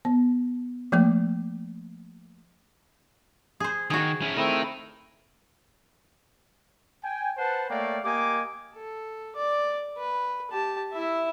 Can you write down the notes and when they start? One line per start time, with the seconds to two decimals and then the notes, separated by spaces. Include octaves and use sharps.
0.05 B3
0.92 F3 A3 A#3 D6
3.60 G#4 C5
3.90 D#3 F#4 G#4
4.22 C#4 E4
4.37 A3 C4 E4 A#4 D#5
7.04 G5 G#5
7.37 B4 C5 F#5 A5
7.70 A3 A#3 C#5 D5 F5 G5
8.05 A#3 G4 D#5 G#5 D6
8.75 A4
9.36 D5 D6
9.98 B4
10.51 G4 A5
10.92 E4 E5